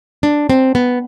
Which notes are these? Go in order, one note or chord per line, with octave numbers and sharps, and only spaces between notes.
D4
C4
B3